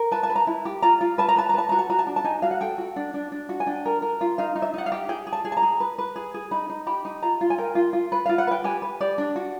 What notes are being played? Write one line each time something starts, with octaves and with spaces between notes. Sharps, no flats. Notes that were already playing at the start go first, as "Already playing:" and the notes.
Already playing: A#4
B4 A5
A5
B4
A#5
E4
G4
F4 A#5
F4
B4 A5
A#5
B4 A5
A#5
B4 A5
F#4 A#5
A5
F#4 A#5
A5
D4
A5
D#4 G#5
F#4 F5
F#5
A4 G5
F#4
D4
D4
D4
F#4
G#5
D4 G5
A#4
A#4
F4
D#4 F5
D#4
E5
D#4 F#5
F5
G4
G#4 G5
G#4
A5
G#4
A5
A#5
G#4
B4
B4
G#4
G#4
D#4 B5
D#4
G4 B5
D#4
F4 A#5
F4
G#5
A#4 G5
F4
F4
B4
F4 F5
F#5
B4 G5
G4 G#5
B4
G4 D5
D4
F#4